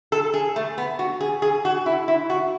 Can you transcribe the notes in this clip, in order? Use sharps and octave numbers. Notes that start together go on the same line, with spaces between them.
A4
G#4
A3
B3
F#4
G#4
G#4
F#4
E4
E4
F#4